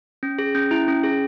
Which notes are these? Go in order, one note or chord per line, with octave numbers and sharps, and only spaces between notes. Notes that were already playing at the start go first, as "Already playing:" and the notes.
C#4
G#4
C#4
E4
C#4
G#4